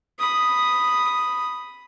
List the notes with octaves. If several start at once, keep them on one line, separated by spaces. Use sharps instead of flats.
B5 D#6